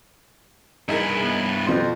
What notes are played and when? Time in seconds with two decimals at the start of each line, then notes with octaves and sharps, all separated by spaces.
0.88 G2 D#4 E4 G#4 A#4
1.21 B3
1.67 F2 B2 F3 C6